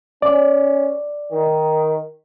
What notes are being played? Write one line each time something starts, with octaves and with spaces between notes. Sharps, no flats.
C#4 D5
D#3